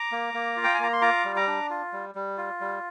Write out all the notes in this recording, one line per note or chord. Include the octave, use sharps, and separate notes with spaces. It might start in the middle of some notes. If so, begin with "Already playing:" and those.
Already playing: A#5 D6
A#3
A#3
F4
G5
G#5
A#3 A#5
C6
F4 A#5 D6
G3
A#5 D6
D4
F4
G3
G3
F4
G3